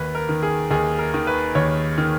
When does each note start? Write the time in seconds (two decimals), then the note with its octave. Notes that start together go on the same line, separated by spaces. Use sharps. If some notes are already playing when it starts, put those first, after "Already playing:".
Already playing: D#2 B4
0.15 A#4
0.29 D#3
0.43 G#4
0.71 D#2 G#4
0.99 A#4
1.14 D#3
1.27 B4
1.55 D#2 C#5
1.98 D#3